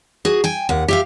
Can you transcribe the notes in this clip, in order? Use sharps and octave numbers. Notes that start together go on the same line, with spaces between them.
F#4 G#4
G5 G#5
D#2 F#5
G4 E5 F5